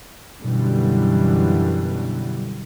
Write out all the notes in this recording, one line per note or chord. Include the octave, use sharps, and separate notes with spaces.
F#2 B2 D3 E3 G3